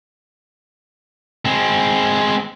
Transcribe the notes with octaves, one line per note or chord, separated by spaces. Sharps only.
G#3 C4